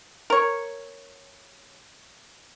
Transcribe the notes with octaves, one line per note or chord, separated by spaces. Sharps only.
A#4 C#5